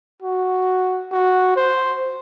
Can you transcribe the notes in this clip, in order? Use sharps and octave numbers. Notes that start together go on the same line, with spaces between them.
F#4
F#4
C5